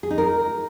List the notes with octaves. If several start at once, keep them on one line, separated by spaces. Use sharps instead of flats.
G#4
D#4
A#4